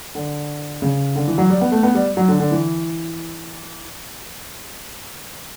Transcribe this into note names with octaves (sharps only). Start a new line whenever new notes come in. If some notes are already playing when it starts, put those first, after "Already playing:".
D3
C#3
D3
E3
F#3
G3
B3
A3
B3
G3
F#3
D3
D3
E3